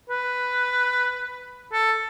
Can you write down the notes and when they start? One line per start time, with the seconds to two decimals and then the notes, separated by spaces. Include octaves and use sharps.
0.10 B4
1.73 A4